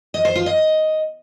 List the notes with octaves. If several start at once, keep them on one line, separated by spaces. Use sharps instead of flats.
D#5
C5
F4
D#5